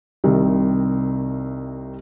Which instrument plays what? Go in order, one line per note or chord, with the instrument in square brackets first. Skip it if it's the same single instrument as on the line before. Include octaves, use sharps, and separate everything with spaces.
[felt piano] C2 C3 D#3